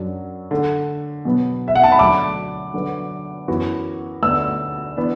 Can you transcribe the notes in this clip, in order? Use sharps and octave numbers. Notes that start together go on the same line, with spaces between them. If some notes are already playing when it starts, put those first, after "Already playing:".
Already playing: F#2 F#3 D4
D3 A3 D4
B2 F#3 B3
E5
F#5
A5
B5
D2 D3 F#3 D4 D6
D3 F#3 D4 B4
F#2 E3 B3 F#4
D2 D3 B3 E6
E3 B3 D4